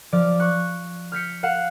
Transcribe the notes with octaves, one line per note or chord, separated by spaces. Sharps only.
F3 D5 F6
C#6 F#6
F6 G6 B6 C#7
F5 F#5 C7 E7